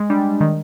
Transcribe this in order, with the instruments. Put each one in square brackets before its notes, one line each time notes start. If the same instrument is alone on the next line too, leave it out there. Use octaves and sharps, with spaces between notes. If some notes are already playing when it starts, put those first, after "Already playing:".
Already playing: [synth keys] G#3
[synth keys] G3 [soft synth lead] D4
[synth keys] D#3